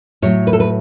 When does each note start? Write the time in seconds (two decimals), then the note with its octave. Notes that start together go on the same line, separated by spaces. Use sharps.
0.22 A2 F#3 C#5
0.47 B4
0.53 A4
0.60 B4